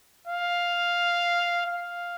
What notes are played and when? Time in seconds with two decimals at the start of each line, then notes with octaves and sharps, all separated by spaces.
0.28 F5
1.66 F5